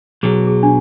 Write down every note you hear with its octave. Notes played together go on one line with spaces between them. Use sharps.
B1 B2 F#3 G#4
G#4
D4